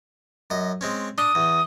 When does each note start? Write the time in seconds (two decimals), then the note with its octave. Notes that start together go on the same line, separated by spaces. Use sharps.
0.50 F#2 D#5
0.81 G#3 C4 C#4
1.18 D4 D#6
1.35 E2